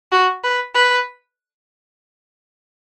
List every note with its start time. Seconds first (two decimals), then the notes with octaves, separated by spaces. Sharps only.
0.12 F#4
0.44 B4
0.75 B4